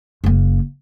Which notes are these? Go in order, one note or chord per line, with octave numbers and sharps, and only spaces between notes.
F#1 A#3